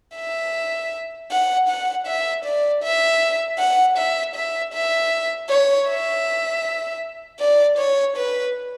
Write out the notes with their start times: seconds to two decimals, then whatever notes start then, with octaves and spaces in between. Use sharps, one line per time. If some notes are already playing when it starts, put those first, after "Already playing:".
0.16 E5
1.31 F#5
1.69 F#5
2.07 E5
2.45 D5
2.83 E5
3.58 F#5
3.97 E5
4.35 E5
4.73 E5
5.49 C#5
5.88 E5
7.40 D5
7.78 C#5
8.16 B4